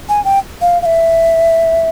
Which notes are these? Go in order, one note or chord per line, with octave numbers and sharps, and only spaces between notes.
G#5
G5
F5
F5
E5